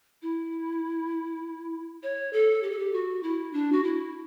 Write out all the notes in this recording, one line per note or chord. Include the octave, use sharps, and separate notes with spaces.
E4
C#5
A4
G4
A4
G4
F#4
E4
D4
F#4
E4